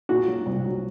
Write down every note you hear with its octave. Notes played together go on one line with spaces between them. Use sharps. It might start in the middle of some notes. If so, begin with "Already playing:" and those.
A#2 F#4
F#3
C2
F#3